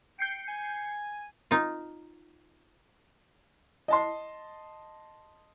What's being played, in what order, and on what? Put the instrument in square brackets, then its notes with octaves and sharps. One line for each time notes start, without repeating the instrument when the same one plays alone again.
[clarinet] G5 [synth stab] G6 C7 C#7
[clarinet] G#5
[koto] D#4 F4
[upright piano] D#5 A5 C6